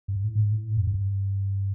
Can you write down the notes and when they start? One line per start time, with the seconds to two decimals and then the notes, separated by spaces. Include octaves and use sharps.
0.08 G2
0.24 A2
0.35 G#2
0.52 A2
0.77 F#2
0.87 G2